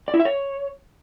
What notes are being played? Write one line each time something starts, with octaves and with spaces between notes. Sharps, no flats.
D5
E4
E5
C#5